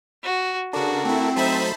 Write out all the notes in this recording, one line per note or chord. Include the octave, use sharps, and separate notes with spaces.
F#4
C#3 D4 F#4 A4 A#4
A3 C4 E4
F#3 A3 D#4 C5 E5 A5 B5